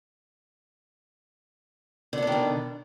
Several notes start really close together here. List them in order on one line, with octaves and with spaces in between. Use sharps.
D3 B3 D4 D#3 B2